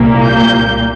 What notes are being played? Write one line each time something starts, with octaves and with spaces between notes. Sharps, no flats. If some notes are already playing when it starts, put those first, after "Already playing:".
Already playing: C2 A#2 G3 A#3
G6